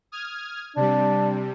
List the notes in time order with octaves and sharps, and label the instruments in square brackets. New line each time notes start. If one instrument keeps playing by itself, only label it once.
[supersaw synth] D#6 F6 G#6
[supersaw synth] C3 G3 [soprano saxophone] D4